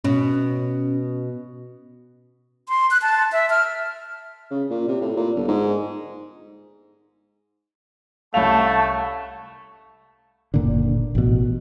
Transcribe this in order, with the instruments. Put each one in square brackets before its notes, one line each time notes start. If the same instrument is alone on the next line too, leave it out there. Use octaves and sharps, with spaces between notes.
[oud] B2 [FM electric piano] C#4
[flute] C6
F#6
A5
E5
F6
[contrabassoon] C#3
A#2
C3
A2
A#2
G1
G#2
[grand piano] C2 C#4 F7 [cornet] A3 [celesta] F5 [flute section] A5 C#6
[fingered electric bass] F#1 A#2 D3
A1 B2